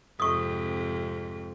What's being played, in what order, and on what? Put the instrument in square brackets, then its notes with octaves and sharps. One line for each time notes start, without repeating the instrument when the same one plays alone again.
[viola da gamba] F2 G#2 C3 [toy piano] C#6 D#6